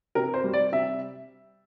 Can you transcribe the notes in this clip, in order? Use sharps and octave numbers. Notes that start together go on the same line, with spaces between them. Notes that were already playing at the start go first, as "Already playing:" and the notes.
C3 A#4
C5
G3
D5
C3 E5